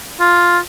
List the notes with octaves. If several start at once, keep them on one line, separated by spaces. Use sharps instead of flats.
F4